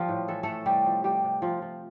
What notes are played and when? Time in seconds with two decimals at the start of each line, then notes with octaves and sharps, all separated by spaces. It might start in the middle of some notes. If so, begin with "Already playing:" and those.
Already playing: F3 G3 F4
0.09 A2
0.28 E3 A4
0.43 A2 A3 A4
0.66 C3 G3 G4
0.85 F3
1.04 F3 G3 G4
1.24 C3
1.42 C3 F3 F4
1.62 F3